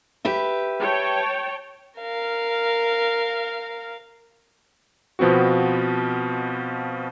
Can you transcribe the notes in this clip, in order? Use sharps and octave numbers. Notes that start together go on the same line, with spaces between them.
G4 B4 E5
C#5 G5 A5
A#4 F5
B2 F3 B3 C4 F#4